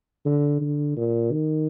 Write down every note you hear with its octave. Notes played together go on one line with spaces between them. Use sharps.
D3
D3
A#2
D#3